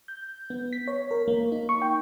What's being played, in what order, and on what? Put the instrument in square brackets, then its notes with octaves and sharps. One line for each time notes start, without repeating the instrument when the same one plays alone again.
[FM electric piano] G6
B3
B6
C#5
A#4
A#3
D#4
C#6
G5